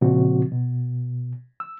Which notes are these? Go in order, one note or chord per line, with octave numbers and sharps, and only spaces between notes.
A#2 C#3 F3 C4 F#4
B2
E6